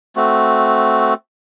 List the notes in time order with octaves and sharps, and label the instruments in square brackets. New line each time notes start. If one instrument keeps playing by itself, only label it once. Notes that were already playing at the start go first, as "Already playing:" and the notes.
[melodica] A3 C4 F#4